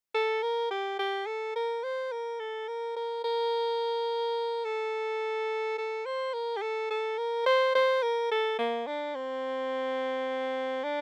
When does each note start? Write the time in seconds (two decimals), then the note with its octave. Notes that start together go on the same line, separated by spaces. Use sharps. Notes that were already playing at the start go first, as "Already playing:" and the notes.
0.14 A4
0.43 A#4
0.71 G4
0.99 G4
1.26 A4
1.56 A#4
1.83 C5
2.12 A#4
2.40 A4
2.68 A#4
2.96 A#4
3.24 A#4
4.64 A4
5.78 A4
6.06 C5
6.34 A#4
6.57 G4
6.62 A4
6.90 A4
7.18 A#4
7.46 C5
7.75 C5
8.02 A#4
8.31 A4
8.59 A#3
8.87 D4
9.15 C4
10.84 D4